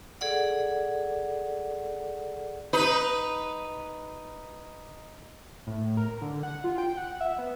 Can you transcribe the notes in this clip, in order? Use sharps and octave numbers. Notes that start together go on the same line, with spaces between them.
G#4 A4 D5 F#5
D#4 B4
A2
A#4
D3
F#5
F4
G5
F#5
E5
B3